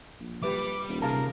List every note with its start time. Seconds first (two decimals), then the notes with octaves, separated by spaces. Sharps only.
0.20 A#1
0.43 G3 G4 B4 E5 D6
0.88 D#1
1.02 C3 G#4 A#4 F5 A5